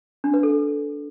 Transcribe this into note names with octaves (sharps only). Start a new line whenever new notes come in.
D4
B4
A4